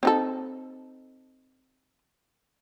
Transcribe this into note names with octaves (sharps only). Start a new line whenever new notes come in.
C4 D#4 A4